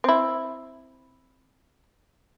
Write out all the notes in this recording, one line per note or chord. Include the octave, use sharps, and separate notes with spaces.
C4 E4